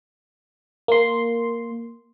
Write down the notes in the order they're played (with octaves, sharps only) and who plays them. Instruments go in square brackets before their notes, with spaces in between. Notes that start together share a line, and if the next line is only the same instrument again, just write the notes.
[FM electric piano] A#3 C6